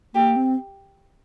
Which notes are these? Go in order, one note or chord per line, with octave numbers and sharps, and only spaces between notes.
A#3 G4
C4